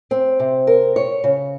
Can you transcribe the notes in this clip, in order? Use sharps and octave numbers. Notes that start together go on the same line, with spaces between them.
C4
C3
A#4
C#5
C#3